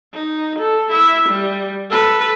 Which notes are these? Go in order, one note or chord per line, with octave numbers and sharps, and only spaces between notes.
D#4
A4
E4 E5
G3
A4 B4